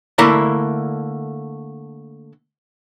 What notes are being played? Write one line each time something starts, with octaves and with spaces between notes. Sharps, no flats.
D3 A3 A#3 E4 A#5